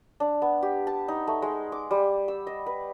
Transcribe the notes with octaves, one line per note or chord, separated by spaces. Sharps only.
D4
B3
G4
A5
D#4
A3
G#3
D6
G3
E6
D#5
B4